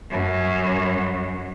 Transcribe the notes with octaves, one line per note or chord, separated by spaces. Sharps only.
F#2